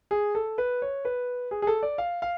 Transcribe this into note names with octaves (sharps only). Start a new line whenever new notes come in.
G#4
A4
B4
C#5
B4
G#4
G#4
A4
D5
F5
F5